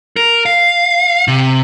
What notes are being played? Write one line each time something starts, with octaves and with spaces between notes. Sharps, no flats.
A#4
F5
C3